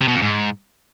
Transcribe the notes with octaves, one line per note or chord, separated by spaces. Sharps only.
C3
B2
F2
G#2